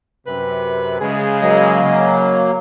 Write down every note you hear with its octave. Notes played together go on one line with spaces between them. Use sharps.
F#2 C3 B4
C#3 G#3 G#4
F#3 A#3 D#5
C#3